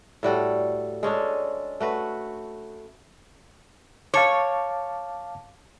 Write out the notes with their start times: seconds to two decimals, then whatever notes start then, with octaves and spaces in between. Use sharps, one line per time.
0.23 A2 G3 F#4 A4
1.03 G#3 C#4 D4 A4
1.80 A3 F#4 B4
4.14 C#5 F5 A5 D6